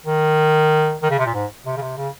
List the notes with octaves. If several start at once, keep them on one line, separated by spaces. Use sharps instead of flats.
D#3
D#3
C#3
C3
A#2
G#2
C3
C#3
C3
C#3